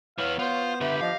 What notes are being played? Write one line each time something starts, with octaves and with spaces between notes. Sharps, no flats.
E3 B3 C#5 F5
B3 F4 C5
D3 G4 B4 E5
F3 D#5 F5